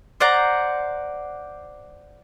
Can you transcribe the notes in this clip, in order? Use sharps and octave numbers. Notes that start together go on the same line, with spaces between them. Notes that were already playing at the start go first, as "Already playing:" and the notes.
C5 D5 F#5 A#5